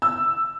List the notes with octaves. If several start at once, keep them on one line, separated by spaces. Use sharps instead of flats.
E6